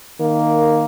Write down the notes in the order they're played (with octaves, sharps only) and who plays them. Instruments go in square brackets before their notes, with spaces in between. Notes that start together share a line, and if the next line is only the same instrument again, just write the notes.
[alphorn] D#3 [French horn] A#3